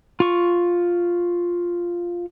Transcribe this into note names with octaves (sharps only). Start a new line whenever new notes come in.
F4 C#6